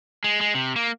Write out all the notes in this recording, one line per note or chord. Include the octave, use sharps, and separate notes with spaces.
G#3
G#3
C3
A#3